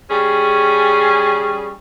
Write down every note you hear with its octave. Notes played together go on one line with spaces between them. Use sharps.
G3 C#4 G#4